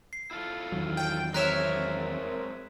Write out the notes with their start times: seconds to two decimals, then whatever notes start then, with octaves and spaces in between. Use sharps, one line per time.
0.13 C7
0.31 E4 F4 A4
0.72 E2 D#3 F#3
0.97 G5
1.34 G#3 C4 A#4 C#5 E5 F#6 B6 E7